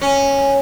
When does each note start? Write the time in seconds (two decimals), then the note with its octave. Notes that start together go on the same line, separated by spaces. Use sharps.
0.01 C#4